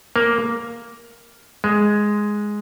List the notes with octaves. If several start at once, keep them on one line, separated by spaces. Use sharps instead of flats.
A#3
G#3